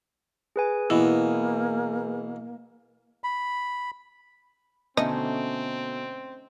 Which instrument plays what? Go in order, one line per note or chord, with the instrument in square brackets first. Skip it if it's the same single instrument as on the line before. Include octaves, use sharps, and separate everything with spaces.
[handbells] G#4 B4 G#5
[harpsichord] B2 E3 [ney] A#3 [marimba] E4
[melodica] B5
[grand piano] B2 D3 [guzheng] A3 C#4 D#4 [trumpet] C4 [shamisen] D#5